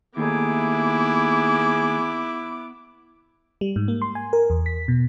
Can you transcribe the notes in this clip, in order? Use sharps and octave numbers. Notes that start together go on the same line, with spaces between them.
D#2 A3 B3 D#4 E4 G#4 D6
G3
G#2
A#3
C6
G#5
A#4
E2
B6
B2